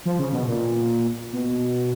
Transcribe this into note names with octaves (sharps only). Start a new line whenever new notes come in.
F3
C#3
B2
A#2
B2